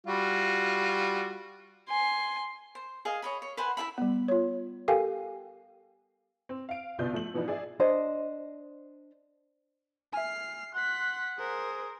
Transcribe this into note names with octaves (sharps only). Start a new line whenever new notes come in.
G3 F4 F#4
G#5 C6
C5
G#4 D#5 F5
C#5 D#5 B5
C#5
B4 C5 F#5 G#5
E4 G#4 E5 B5
G3 B3
F4 C#5
G4 A4 A#4 F5 G5 G#5
C4
F5 D7
G1 C2 B2 F4 D5 G6
F3 A3 F#7
B2 E3 F3 B3 D4 D#4
G#4 D5 E5
D4 C5 D#5
E5 G#5 F6 C7
F#5 C6 F#6 B6
G#4 A#4 C5